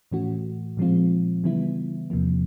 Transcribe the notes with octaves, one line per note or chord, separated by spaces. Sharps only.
A2 E3 A3 C#4 F#4
A#2 F3 G#3 C4 F4
C#3 E3 G3 B3 E4
E2 C3 F3 A#3